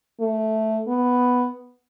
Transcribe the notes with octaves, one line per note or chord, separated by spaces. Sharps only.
A3
B3